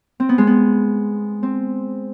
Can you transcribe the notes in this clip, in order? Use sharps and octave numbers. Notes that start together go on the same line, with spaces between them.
C4
B3
G#3
B3
C4